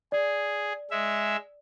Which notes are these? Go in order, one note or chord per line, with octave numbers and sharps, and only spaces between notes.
G#4 D5
G#3 E5